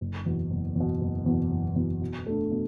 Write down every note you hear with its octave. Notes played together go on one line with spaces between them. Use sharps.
F#1
E2 B2
F#1
E2 B2
F#1
E2 B2
F#1
E2 B2
B2
A3 D4
B2